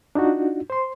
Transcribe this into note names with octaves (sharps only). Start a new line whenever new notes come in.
D4 D#4 F4 F#4
C5 C6